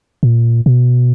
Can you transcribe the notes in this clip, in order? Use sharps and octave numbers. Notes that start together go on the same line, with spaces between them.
A#2
B2